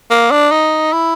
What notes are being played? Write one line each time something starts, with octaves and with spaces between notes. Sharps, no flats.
A#3
D4
D#4
E4